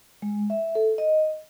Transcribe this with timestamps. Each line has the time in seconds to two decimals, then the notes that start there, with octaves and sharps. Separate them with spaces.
0.22 G#3
0.50 E5
0.75 A4
0.98 D#5